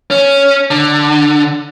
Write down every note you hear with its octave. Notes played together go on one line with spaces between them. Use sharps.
C#4
D3